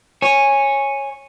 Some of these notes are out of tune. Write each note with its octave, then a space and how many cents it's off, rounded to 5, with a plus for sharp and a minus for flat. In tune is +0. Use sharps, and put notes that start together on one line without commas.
C#5 -10 G#5 -5